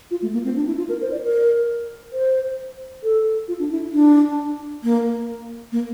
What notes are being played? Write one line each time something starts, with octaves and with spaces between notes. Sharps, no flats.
F4
A3
A#3
C4
D4
E4
F4
A#4
C5
D5
A#4
C5
A4
F4
D4
E4
D4
A#3
A#3